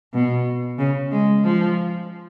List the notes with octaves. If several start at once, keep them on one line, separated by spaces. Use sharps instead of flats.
B2
C#3
G#3
F3